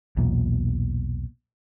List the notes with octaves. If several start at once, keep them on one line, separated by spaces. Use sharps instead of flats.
B1 E2 A#2